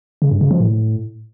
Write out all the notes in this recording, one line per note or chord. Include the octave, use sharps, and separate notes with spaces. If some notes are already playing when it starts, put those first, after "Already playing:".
C#3
G2
C#3
F3
A2